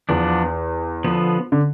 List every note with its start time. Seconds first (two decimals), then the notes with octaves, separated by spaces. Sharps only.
0.09 E2 F3 B3 D4
1.04 D3 F3 B3
1.52 D3